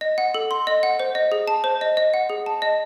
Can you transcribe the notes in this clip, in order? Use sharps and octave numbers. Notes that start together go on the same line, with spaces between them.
D#5
F#5
A4
C6
D#5
F#5
C5
D#5
G#4
A5
C5
D#5
D#5
F#5
G#4
A5
D#5